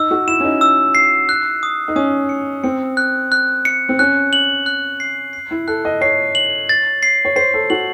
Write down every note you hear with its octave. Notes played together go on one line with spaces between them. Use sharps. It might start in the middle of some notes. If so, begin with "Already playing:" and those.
Already playing: D#4 E6
F#4
E4 E7
C#4
D#4
E6
C7
F#6
D#6
D#4
C#4 D#6
C#7
C4 C#7
F#6
F#6
C#7
C4
C#4 F#6
F#7
F#6
C7
C7
E4
A4 F#6
D#5
C#5 C7
F#7
A6
C7
C#5
C5 C7
A4
F#4 F#7